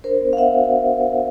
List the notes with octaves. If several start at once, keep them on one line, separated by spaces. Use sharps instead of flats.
D4 A#4 C5
B3
F5
B3 E5 F#5
F#4